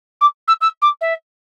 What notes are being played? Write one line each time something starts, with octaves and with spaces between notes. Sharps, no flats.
D6
E6
E6
D6
E5